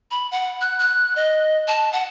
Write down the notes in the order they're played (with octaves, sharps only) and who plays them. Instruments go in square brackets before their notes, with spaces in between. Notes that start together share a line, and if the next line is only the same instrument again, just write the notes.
[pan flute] B5
F#5
F#6
F#6
D#5
A5
F#5